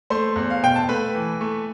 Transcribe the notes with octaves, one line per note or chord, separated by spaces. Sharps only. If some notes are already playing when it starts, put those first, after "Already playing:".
A3 C5 C6
E2
F5
B2 G5
A5
A3 B4 B5
E3
A3